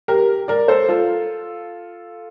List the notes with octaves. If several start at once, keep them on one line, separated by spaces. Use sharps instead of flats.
G4 A#4
A#4 D5
A4 C5
F4 A4